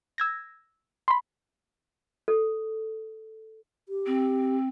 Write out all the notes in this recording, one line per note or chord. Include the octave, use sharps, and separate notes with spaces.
E6 G#6 A#6
B5 C6
A4
G4
C4